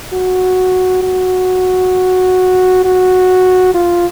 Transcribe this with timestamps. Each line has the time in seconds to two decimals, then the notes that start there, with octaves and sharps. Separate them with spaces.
0.13 F#4
1.03 F#4
2.85 F#4
3.74 F4